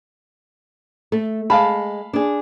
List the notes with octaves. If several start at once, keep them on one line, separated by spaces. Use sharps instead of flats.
A3
G#3 F5 A5 B5
D4 G#4